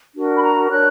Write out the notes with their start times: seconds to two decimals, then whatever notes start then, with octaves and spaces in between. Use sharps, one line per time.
0.14 D4 F#4 A#4
0.35 B5
0.42 A#5
0.69 D4 A#4 C#5 F#6